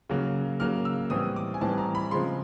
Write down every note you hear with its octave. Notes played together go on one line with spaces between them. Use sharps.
C#3 F#3 A#3
C#3 F#3 A#3 F6
E6
A2 E3 G3 C4 D#6
D6
G#5
A2 E3 G3 C4 A5
A#5
B5
C#3 F3 G#3 C4 C6